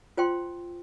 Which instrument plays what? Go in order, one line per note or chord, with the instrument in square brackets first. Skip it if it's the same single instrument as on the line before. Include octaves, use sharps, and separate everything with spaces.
[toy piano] F4 C5 G5 C6